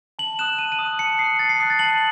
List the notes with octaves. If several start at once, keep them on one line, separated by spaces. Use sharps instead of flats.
A5 F#7
D#6 F#6 E7
A5 D#7
D#7
D#6 F#6
A5 C#7
D#6 F#6 C7
A5 A6
C7
D#6 F#6 C7
A6
A5 F#7